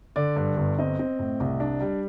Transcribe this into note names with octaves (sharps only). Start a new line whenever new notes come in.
D3 D5
G2
G1
C4 D#5
C4
A2
C2
D4
G3